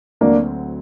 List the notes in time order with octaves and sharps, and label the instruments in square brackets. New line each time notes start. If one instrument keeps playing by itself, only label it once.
[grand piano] D2 D3 F#3 C4 F#4 [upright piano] A#3 D4